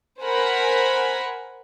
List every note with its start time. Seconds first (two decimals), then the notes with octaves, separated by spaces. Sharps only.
0.22 A#4 C5 F#5 G#5 B5